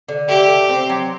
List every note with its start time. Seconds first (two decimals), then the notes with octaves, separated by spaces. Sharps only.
0.09 D3
0.29 A3 G4
0.49 A3
0.69 C4
0.89 F#3